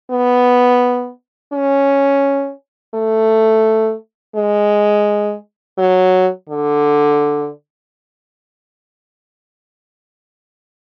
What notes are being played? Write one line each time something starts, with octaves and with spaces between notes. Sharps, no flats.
B3
C#4
A3
G#3
F#3
D3